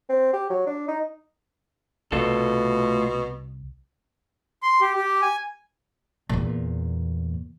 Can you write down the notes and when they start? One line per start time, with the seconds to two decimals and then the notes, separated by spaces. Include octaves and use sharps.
0.09 C4
0.34 G4
0.50 F#3
0.67 D4
0.88 D#4
2.12 C2 B2 A3 F4 A4
4.63 C6
4.81 G4
4.96 G4
5.22 G#5
6.29 E2 A#2